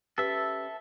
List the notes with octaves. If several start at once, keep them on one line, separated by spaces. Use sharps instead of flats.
C#4 G4 A4 B4 E5